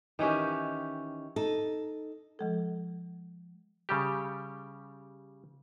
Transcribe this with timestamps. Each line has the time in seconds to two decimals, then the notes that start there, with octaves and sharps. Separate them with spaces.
0.19 D#3 E3 C#4 G4
1.36 D#4 A4
2.39 F3 G#3 A4
3.89 C#3 G3 G4